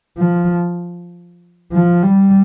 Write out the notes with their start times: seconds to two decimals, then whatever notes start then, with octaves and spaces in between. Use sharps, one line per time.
0.17 F3
1.72 F3
2.03 G3